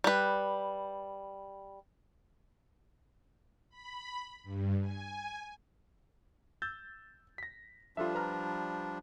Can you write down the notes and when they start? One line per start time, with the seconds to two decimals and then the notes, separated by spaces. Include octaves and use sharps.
0.04 G3 B4
3.69 B5
4.43 G2
4.80 G#5
6.62 E6 G6 A6
7.38 A#6 B6
7.97 F3 G3 D4 F4 A4 E5
8.15 B4 A#5 F6